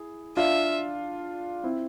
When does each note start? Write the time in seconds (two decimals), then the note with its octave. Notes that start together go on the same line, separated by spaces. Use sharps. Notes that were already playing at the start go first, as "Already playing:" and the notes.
Already playing: E4 G#4
0.37 D4 F4 E5
1.64 C4 E4